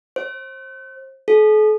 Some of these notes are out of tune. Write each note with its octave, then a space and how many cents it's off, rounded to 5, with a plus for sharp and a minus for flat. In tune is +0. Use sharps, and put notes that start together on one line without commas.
C5 +30
A4 -45